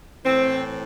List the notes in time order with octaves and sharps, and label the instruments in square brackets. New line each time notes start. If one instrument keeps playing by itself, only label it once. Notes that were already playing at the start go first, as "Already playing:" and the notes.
[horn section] A2 E3 C4